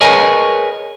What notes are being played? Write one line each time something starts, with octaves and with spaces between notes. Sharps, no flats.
G#4 A#4 B4 C#5 D#5 G#5